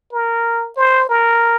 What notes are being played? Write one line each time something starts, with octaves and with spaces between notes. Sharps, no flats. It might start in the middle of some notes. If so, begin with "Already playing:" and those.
A#4
C5
A#4